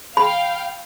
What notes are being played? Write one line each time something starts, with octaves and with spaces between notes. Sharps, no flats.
F5 G5 B5